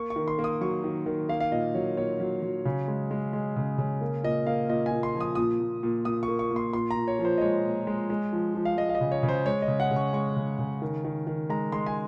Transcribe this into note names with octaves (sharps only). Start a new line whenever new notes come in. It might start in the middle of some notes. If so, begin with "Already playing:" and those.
Already playing: A#3 C#6
C#6
D#3
C6
A#3
D#6
F#3 C#6
D#3
D#3
A#3 F5
F5
A#2 D#5
F#3 C#5
A#2 C#5
F#3
F#3
C#3
G#3
G#3
G#3
C#3
C#3
A#3
A#2 D#5
A#3 F5
A#2 D#5
G#5
A#2
C6
F3
D#6
A#2 D#6
A#2
A#2
A#2 D#6
C#6
A#3
C#6
A#2
C6
A#2 C6
A#5
A#2
C#5
F3
C5
D#5
G#3 C#5
A#2
G#3
G#3
F3
F3
F5
G#3 D#5
F5
D#5
C#3
C#5
C#3
C5
G#3 C#5
D#5
C#3
F#5
C#3
C#6
G#3 C#6
C#3
C#3
D#3
D#3
D#3
G#3 A#5
G#3 C6
G#5